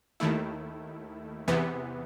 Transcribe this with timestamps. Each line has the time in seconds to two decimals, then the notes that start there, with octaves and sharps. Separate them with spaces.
0.20 D#2 D#3 A3 E4
1.47 E2 C3 E3 B3